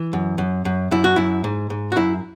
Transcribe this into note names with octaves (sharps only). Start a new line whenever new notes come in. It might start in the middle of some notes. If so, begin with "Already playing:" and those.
Already playing: E3
F#2
F#2
F#2
F#2 E4
F#4
F#2 E4
G#2
G#2
F#4
F#2 E4